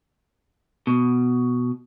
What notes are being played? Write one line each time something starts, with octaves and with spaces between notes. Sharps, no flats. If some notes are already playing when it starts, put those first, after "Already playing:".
B2